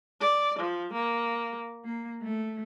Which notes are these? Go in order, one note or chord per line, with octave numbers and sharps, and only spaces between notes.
D5
F3
A#3
A#3
A3